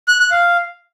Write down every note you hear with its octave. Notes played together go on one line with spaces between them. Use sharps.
F#6
F#6
F5